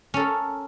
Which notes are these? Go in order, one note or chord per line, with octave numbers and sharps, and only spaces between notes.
C#4 A4 A#4